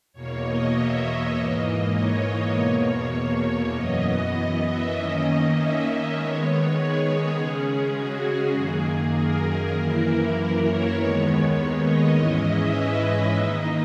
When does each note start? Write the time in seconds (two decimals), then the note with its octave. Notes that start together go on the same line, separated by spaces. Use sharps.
0.13 E2 B2 A#3 C#5
0.42 D#5
0.73 E5
1.33 G#2 E3 A#3 D#5
1.93 C#5
2.53 E2 B2 A#3
3.13 C#5
3.73 F#2 E3 B3 D#5
4.63 E5
4.93 D#3 A#3 C#4 D#5
5.52 E5
5.82 D#5
6.13 D#3 G#3 B3 C#5
6.73 G#4
7.03 G#4
7.33 C#3 G#3 C#4
7.92 F#4
8.22 G#4
8.53 F#2 D#3 A#3
9.14 A#4
9.43 A#4
9.73 F#2 E3 A#3 E4
10.03 A#4
10.33 A#4
10.63 C#5
10.93 D#2 D#3 G#3 B3
11.23 C#5
11.83 D#5
12.13 G#2 E3 G#3 C#4 E4
12.43 E5
12.73 B4
13.03 D#5
13.33 D#3 A#3 D#4